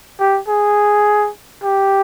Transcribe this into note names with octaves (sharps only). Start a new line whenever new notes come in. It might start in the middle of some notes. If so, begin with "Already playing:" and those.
G4
G#4
G4